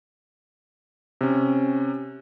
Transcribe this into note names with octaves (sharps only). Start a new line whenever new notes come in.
C3 C#4